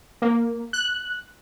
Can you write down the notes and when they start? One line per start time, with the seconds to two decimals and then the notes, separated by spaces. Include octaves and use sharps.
0.22 A#3
0.73 F#6